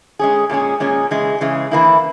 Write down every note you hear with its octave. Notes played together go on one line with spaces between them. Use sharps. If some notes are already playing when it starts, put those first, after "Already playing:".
G#3 C#4 G#4
A#2 G#3 C#4 G#4
A#2 G#3 C#4 G#4
C#3 E3 G#3
C#3 E3 G#3
E3 A#3 E4